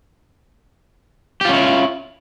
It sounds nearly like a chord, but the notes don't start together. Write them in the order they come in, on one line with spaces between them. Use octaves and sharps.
G4 F4 C#4 E4